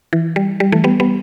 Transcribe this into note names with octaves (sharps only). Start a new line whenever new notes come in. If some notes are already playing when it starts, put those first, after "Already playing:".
E3
G3
G3
E3 A3
G3 B3
G3 B3